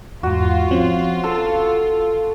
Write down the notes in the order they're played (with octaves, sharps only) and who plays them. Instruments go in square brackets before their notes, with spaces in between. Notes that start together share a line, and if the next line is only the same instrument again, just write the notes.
[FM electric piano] E2 G#2 [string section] F4 [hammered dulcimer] F#4
[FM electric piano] F3 C4 C#4
[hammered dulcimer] A4 [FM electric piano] E6